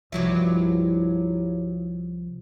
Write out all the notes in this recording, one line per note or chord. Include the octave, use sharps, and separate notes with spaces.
C2 G2 F3 F#3 E4